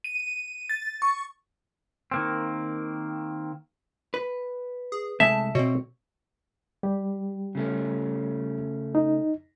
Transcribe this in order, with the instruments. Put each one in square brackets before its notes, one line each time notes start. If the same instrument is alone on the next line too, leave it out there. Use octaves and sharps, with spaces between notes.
[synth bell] D#7
A6
C#6
[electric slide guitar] D#3 A#3 C4
[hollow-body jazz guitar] B4
[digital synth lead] G#4
[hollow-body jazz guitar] C2 G#3 A3 [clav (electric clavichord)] E5 [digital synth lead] A5
[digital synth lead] B2 [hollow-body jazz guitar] C4 C#5
[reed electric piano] G3 G4
[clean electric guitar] C#3 A3 C#4
[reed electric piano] D#4